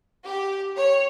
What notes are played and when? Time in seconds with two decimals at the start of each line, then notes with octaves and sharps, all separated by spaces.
0.25 G4
0.75 C#5